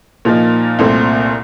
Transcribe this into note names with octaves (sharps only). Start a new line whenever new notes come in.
A#2 F3 A#3 D#4
C2 A#2 A3 C4